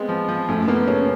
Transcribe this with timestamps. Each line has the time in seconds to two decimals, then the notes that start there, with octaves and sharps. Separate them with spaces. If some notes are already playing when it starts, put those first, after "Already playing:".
Already playing: G#3 B3 C4
0.09 F3
0.28 F3
0.48 F#2 A3
0.67 A#3 B3
0.87 C#3 C#4